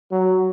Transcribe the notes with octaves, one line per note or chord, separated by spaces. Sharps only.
F#3